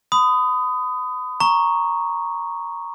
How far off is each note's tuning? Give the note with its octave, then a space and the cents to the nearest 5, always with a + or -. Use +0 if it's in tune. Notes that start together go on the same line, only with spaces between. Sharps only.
B5 +35 D#6 +0
A#5 +0 C#6 +0